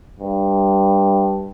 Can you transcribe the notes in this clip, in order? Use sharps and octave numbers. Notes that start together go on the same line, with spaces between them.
G2